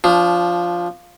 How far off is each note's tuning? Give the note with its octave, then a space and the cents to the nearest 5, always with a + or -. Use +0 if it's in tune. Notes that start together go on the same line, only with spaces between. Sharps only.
F3 +0 D4 -30